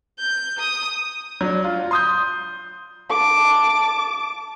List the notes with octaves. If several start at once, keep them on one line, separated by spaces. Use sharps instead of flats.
G6
D#6
F#3 D4
F4
C6 D#6 G6
A5 D6